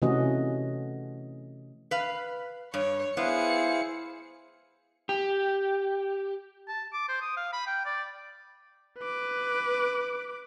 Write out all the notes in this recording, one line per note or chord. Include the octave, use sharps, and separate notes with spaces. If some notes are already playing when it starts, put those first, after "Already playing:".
C3 E3 A3 C#4 F#4 D#5
B4 F5
G2 C#5
B3 E4 G#4 C5 F5 C#7
G4
A5
D6
C5
D#6
F5
B5
G5
D5
B4 D6